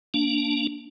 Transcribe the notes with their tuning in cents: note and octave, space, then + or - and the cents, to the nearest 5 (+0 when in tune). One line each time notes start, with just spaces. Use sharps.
A#3 +0 D4 -20